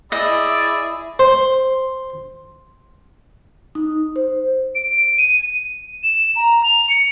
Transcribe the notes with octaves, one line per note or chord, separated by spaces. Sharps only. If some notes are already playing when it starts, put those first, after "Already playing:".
E4 G#4 D5 D#5 B5 E6
C5
D#4
C5
D7
D#7
E7
A#5
F7
C#7